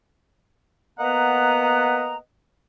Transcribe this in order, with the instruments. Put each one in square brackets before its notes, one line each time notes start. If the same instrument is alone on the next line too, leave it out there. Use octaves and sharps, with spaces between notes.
[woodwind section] A#3 B3 B4 D#5 F#5 A#5